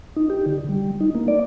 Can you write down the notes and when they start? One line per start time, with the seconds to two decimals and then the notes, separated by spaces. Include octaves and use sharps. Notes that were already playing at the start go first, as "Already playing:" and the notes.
0.16 D#4
0.30 G4
0.46 D3
0.69 G3
1.01 D#4
1.15 A#3
1.28 D5